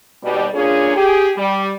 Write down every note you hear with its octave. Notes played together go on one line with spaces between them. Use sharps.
D#2 B2 G3
A#3 C#4 D4 F4 G#4
G4 G#4
G3